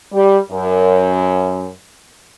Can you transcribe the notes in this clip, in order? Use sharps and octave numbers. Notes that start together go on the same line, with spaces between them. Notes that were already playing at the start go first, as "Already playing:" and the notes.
G3
F#2